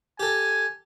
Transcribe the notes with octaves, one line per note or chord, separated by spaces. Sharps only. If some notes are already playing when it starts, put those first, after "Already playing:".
G4 A4 G#5